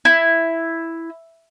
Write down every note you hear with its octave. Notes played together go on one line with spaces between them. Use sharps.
E4